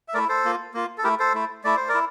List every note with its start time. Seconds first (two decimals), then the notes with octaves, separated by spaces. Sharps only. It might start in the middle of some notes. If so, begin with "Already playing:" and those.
0.08 E5
0.14 A3 A#4 D5
0.17 E4
0.29 A4 C5
0.44 A#3 F4
0.74 A#3 F4
0.98 A4
1.04 A3 E4 G4 A#4
1.19 A4 C5
1.34 A3 E4
1.64 A3 E4 D5
1.76 C5
1.88 A#4 D5
1.94 E4